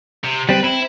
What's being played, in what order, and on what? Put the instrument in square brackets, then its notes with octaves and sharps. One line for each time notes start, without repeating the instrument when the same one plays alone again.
[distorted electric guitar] C3
[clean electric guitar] G3 C4 [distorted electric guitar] B4
[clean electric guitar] C4 [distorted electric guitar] E4